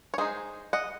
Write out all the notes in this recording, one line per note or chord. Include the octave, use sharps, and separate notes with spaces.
C#5
G#3 D#4 G#4 C5
D#5 F#5